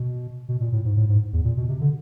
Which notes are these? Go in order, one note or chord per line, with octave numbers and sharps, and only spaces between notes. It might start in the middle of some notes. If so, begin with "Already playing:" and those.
Already playing: B2
B2
A#2
A2
G#2
A2
G#2
E2
A#2
B2
C3
D3